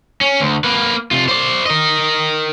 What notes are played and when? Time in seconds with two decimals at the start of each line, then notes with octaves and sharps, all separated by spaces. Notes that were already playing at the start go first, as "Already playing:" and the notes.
0.21 C#4
0.40 D2
0.64 A#3 B4
1.11 C3 F4
1.28 C5 D5
1.66 A#4 D#5